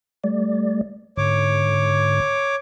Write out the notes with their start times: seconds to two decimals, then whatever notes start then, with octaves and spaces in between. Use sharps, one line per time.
0.24 G3 A3 D5
1.17 G#2 D3 C#5 D6